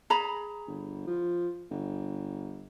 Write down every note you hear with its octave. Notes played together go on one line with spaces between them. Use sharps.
G#4 A#5 B5
G1
F3
G1